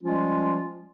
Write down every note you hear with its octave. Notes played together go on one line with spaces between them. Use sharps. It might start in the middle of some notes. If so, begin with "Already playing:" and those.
F3 G3 G#3 C#4 F4